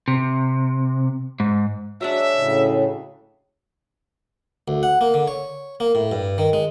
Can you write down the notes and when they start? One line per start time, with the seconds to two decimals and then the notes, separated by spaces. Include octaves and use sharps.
0.08 C3
1.40 G#2
2.01 F#3 G#3 D4 E5
2.35 A2 C#3
4.68 D2
4.83 F#5
5.01 A#3
5.14 D3
5.28 C#5
5.80 A#3
5.95 A2
6.12 G2
6.38 D#3
6.53 G#3